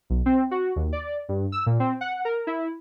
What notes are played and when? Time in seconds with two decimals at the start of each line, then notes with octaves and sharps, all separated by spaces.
0.10 B1
0.26 C4
0.51 F#4
0.76 D#2
0.93 D5
1.29 G2
1.52 E6
1.66 A#2
1.80 C4
2.01 F#5
2.25 A#4
2.47 E4